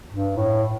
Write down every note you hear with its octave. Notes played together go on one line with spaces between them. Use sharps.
G2
A2